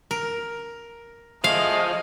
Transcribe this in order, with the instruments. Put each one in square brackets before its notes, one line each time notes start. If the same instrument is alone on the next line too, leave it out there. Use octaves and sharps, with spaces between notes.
[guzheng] A#4
[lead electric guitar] F3 [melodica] A3 G#4 [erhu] D#5 [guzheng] F5